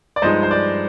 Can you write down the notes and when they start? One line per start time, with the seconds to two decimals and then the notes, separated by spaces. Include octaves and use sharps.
0.16 D5
0.22 G2 F3 G#3 D#4 C5 D#5
0.43 C5
0.51 D5